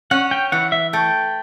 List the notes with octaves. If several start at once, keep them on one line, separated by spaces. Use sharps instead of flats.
C#4 F#5
G5
E3 F#5
E5
A3 G5